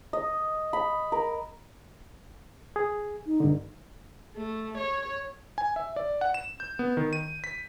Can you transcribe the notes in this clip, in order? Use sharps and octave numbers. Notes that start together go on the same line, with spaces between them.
D#5
B5
A#4
G#4
D#4
G2 D3
A3
C#5
G#5
E5
D5
F#5
E7
G6
B3
D#3
D#7
B6